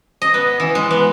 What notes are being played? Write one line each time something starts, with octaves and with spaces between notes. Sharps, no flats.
D#5
B3
E3
G#3
B3